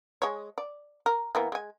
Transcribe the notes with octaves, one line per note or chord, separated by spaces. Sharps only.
G#3 C#5
D5
A#4
E3 A#3 B3
G#3 G#5